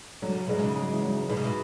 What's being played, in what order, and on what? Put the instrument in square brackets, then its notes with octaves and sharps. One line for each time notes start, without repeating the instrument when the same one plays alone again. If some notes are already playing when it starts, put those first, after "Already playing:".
[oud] D3 [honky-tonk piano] F#3
[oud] C#3
[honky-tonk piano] G#2 G#3 [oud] B2
[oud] C#3
[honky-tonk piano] F#3
E3
F#3
[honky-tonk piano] G#2 G#3 [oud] B2
[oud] C#3
B2